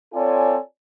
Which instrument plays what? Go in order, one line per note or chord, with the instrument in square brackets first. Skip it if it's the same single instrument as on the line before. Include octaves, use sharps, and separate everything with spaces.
[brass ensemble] C4 F4 A4 C#5 D5 G#5